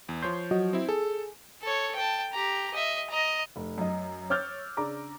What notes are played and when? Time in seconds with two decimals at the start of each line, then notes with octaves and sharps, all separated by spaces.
0.09 E2
0.22 F3 C#5 C6 G6
0.51 F#3 F#4 D#5
0.73 C4 E4
0.89 G#4 A4
1.62 A4 C#5
1.96 G5 A5
2.33 G4 A#5
2.74 D#5 E5
3.10 D#5 A#5
3.56 F1
3.78 F#2 D#5
4.30 C#5 D6 E6 F6 G6 A6
4.77 C#3 D4 A#5 D6